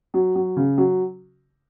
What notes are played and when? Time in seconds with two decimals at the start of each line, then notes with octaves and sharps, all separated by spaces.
0.14 F#3
0.35 F#3
0.57 C#3
0.78 F#3